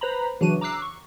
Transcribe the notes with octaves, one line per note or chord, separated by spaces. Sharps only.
B4 C5 A#5 B5
C#3 E3 F#3 D4 F#4 D#7
A#5 D6 E6 F#6 C7
C#6